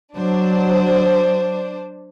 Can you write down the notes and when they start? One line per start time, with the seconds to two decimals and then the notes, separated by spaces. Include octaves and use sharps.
0.17 F#3 D4 C5